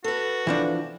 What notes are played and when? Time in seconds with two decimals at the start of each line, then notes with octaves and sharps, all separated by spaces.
0.04 F#4 A4 B4
0.47 E3 F3 D4